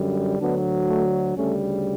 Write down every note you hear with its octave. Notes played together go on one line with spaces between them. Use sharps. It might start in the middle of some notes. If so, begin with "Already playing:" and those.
Already playing: F#2 D3 G3
D2 D3 F#3 B3 D4
A3
D2 C#3 G3 A3 C#4